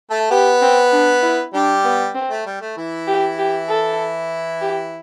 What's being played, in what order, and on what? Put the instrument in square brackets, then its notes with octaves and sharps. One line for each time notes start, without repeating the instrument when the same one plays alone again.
[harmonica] A3 A4
[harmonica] B3 B4 [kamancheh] G4
[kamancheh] C4
D4
E4
[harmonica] G3 G4 [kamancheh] D4
[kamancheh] B3
C4
[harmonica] A3
G3
A3
E3 E4
[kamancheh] G4
G4
A4
G4